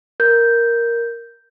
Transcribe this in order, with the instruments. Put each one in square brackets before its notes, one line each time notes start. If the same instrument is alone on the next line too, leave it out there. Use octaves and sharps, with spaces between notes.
[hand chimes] A#4 G6